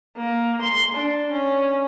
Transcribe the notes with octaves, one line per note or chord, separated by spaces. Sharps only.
A#3
C6
D4
C#4